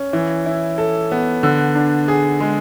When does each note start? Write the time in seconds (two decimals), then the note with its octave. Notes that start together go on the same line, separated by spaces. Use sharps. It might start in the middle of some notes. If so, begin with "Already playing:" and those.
Already playing: C#4
0.13 E3
0.46 E4
0.78 A4
1.12 B3
1.43 D3
1.75 D4
2.08 G#4
2.40 G#3